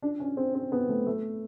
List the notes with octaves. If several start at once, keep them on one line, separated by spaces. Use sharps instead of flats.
D4
C#4
C4
C4
B3
A3
A3